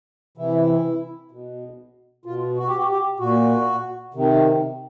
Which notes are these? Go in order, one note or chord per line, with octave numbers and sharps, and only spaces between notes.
C3 E3 E4
B2
B2 F4
F#4
G4
F#4
G4
A#2 F#4
C3 D#3